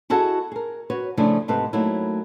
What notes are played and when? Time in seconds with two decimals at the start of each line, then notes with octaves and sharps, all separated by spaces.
0.10 E4 F#4 G#4 A4 D#5 F#5
0.52 G#4 A#4
0.90 F#4 B4 C#5
1.17 C#3 F3 A3 D4 E4
1.48 G#2 C3 A4 B4
1.73 F#3 A3 A#3 C4 D#4 E4